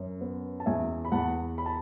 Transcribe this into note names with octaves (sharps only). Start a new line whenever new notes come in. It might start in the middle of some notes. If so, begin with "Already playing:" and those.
Already playing: F#2
B3
A5
E2 E5 G#5
B5
E2 F#5 A5
B5
A5